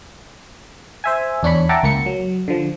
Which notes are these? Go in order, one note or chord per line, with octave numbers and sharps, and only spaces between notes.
C5 E5 G#5
E2 D4 C#5 B5
E5 F#5 G5 A5 A#5 D6
C#2 A#3 C#7
F#3
D3 F3